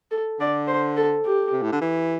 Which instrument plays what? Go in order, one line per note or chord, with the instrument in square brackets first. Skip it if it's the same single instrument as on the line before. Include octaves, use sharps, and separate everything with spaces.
[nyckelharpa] A4
[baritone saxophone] D3 [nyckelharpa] D5
[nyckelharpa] C5
A4
G4
[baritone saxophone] C3
A2
D3
E3